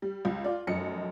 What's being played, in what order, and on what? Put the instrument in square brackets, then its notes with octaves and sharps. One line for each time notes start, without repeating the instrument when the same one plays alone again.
[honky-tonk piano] G3
C#2
F4 D5
F1 F#2 D#5 C#7